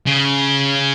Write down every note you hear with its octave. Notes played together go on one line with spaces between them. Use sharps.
C#3